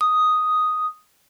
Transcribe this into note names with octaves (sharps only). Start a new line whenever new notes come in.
D#6